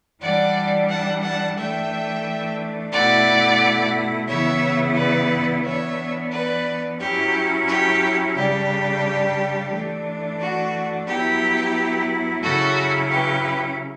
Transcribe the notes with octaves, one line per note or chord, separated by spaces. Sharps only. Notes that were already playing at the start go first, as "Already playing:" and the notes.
E3 G3 D4 D5 F#5
F#5 A5
F#5 A5
E3 A3 D4 E5 G5
B2 A3 E4 D5 F#5
C#3 E3 B3 E4 C#5 E5
B4 D5
E3 B3 D4 C#5 E5
B4 D5
F#3 C#4 E4 G4
G4
C#3 G3 D4 G4
E3 A3 D4
F#4
F#3 B3 E4 G4
C#3 F#3 C#4 E4 F#4 A4
G4 B4